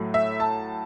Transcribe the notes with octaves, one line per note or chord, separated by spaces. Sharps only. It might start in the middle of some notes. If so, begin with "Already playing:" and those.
Already playing: A2 F#3 A3
E5
A5